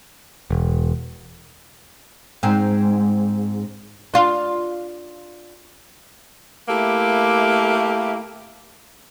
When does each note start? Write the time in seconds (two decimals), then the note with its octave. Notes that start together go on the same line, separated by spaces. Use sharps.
0.51 E1
2.43 G#2 C4
4.14 D4 F4
6.69 A3 A#3 E4 G4